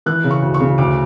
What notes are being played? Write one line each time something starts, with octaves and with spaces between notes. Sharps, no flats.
E3 F#6
C#3
C#6
D2
C#6
C#3
D2 D6